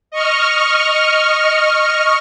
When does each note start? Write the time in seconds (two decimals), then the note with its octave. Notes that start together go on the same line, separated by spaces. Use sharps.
0.11 D#5 C#6 F6